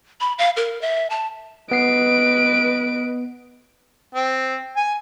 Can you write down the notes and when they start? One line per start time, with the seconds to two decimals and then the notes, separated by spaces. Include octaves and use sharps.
0.21 B5
0.38 F5
0.57 A#4
0.81 E5
1.10 A5
1.71 B3 B4 D#5 C7 D7
4.15 C4
4.76 G#5